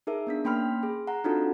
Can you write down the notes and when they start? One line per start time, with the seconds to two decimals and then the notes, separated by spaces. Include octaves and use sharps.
0.07 D#4 G#4 A#4 E5
0.27 B3 D4 B6
0.45 A#3 C#4 G5 B5 C6 F6
0.83 G#4
1.07 F#5 A#5
1.24 C4 D4 D#4 F4 F#4 A4